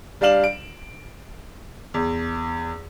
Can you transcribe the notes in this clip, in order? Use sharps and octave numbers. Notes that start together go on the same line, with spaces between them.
G3 D4 D5 F5 E7 F#7
D7
E2